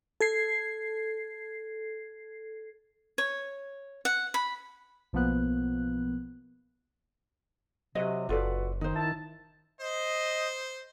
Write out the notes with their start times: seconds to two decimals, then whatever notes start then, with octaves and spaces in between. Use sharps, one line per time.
0.21 A4 G#6 C7
3.18 C#5
4.05 F#5
4.34 B5
5.13 B1 F3 A#3 B3 F#6
7.95 C3 F#3 B4 D#5
8.29 F#1 F4 F#4 A4 B4 D5
8.81 D#3 D#4 C5
8.95 E4 A5
9.81 C5 D#5